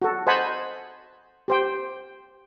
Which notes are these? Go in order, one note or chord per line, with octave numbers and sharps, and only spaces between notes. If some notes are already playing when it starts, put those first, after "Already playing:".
F#4 A4
C5 D#5 F#5 G#5 A5 B5
G4 C5 G5